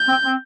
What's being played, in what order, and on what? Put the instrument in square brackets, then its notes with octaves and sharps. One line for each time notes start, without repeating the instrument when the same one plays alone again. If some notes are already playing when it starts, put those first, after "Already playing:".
Already playing: [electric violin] G6
[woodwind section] C4
C4